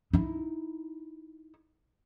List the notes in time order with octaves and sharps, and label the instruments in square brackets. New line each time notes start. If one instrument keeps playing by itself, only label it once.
[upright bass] D#4 E4